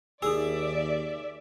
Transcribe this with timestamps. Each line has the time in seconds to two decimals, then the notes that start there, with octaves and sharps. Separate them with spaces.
0.22 D#2 D#4 G#4 D5 E5 E6